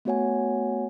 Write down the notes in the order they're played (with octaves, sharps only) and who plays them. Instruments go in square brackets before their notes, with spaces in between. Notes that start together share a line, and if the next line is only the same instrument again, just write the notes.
[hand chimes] A3 B3 F#4 C#5 F#5 G#5